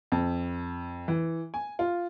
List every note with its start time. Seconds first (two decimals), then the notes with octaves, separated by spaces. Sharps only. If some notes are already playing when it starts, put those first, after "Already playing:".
0.12 F2
1.08 E3
1.54 G#5
1.79 F4